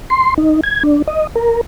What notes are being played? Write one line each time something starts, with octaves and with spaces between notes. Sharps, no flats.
C6
D#4
G#6
D4
D#5
A#4